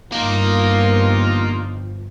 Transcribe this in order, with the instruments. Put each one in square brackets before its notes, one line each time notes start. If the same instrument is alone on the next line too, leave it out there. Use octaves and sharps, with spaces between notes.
[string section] G1 F3 [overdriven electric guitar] A#3 [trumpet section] D#4 F4